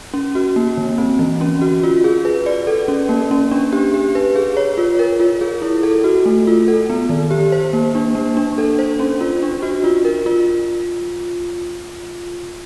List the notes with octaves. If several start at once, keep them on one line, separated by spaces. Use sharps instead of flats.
C#4
F#4
A#3
D3
C4
E3
C#4
F#4
F4
G#4
B4
D5
A4
C#4
A#3
C#4
D4
G4
G4
B4
G#4
C#5
F4
A#4
F4
G#4
E4
A4
F#4
A3
F4
A4
B3
D#3
G4
C5
A#3
D4
A#3
D4
A4
C5
C#4
F4
D4
F#4
F4
A#4
F4